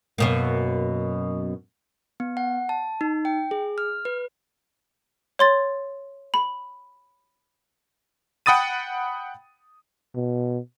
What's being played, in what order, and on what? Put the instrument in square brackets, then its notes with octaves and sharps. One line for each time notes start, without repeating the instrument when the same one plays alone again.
[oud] F#2 B2 A#3
[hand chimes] B3
F#5
A5
D#4
G5
G#4
F6
B4
[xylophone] C#5 C6 A6
B5
[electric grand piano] F#5 G5 B5 D#6 A6 D#7
[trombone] B2